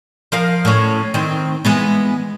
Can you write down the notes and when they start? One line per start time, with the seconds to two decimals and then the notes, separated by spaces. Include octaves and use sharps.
0.32 F3 A#4 F5
0.65 A2 C#4
1.14 D#3 C4
1.65 E3 G#3 B3